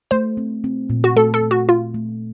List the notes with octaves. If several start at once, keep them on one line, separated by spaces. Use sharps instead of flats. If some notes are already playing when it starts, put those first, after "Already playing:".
A3 C5
C4
C4
A#2
F#4
A3 A4
A4
A3
F#4
A3 F4
A3